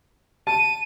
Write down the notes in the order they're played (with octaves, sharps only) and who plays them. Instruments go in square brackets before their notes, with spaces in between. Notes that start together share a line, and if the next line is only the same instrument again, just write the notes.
[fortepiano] A5 [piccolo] D#7